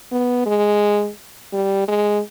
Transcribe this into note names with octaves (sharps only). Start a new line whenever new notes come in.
B3
G#3
G3
G#3